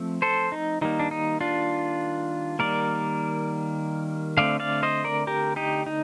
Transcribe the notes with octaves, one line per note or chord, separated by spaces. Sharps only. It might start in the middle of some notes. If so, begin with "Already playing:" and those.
Already playing: F3 A3 C4
A4 C5
D#4
D#3 G3 A#3 D#4
D4
D#4
D4 F4
D#3 G3 A#3 A#4 D5
D3 A3 C4 D5 F5
D5 F5
C5 D#5
A#4 D5
G4 A#4
D#4 G4
D#4